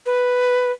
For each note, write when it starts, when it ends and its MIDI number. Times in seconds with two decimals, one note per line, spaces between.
0.06 0.71 71